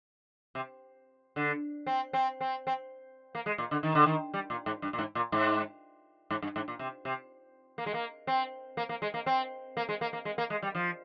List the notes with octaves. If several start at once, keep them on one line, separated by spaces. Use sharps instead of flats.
C3
D3
C4
C4
C4
C4
A#3
G#3
A#2
D3
D#3
D3
D#3
G3
A#2
G#2
G2
A#2
G#2
A#2
G#2
G#2
G2
G#2
A#2
C3
C3
A#3
G#3
A#3
C4
A#3
A#3
G#3
A#3
C4
A#3
G#3
A#3
A#3
G#3
A#3
G#3
G3
F3